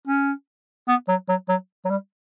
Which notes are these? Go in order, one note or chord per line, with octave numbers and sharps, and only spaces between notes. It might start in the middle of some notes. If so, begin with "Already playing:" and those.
C#4
B3
F#3
F#3
F#3
F#3
G3